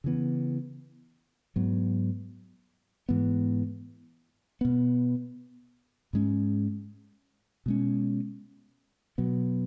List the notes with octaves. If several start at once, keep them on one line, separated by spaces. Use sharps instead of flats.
C#3 E3 B3
G#2 F#3 B3
G#2 E3 B3
B2 B3
G#2 G#3 C#4
B2 G#3 C#4
B2 F#3 B3